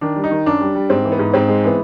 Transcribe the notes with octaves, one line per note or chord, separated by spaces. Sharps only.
D#3 D4
G3
D#4
D#3
F#2 D4
G3
G3
G#2 C4
E3
B3
G#2
G#2 C4
G#3
E3 B3